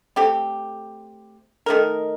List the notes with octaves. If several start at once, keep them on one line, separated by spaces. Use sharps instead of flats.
A3 C4 G4
D#3 A3 D#4 A#4